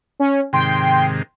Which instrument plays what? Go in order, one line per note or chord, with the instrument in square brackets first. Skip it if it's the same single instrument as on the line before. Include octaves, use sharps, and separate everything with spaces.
[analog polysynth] C#4
[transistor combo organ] G#2 C3 D#3 [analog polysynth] G5 C6